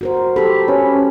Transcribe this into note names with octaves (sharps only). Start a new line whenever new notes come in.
F#4 A#4 C5
G4 A4 B5
C#4 B4